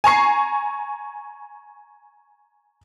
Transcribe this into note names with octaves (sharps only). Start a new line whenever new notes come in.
G#5 A#5 C#6 C7